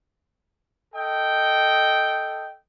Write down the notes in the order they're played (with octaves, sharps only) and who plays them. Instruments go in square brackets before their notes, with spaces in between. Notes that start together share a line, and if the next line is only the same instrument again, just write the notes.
[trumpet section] A4 D#5 G5